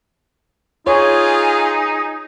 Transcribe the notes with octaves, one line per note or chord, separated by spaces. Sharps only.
D#4 F4 G#4 C#5